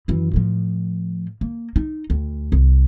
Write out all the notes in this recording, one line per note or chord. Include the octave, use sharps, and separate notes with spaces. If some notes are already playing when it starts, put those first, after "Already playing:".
F#2 E3
A2 F3
A#3
D#4
D2
C2